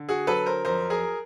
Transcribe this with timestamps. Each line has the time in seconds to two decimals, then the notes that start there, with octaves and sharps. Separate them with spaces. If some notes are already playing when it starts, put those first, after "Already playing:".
Already playing: D3
0.09 F#4 G#4
0.27 F#3 A4 B4
0.46 A#4 C5
0.65 F2 A#4 C5
0.90 G#4 A#4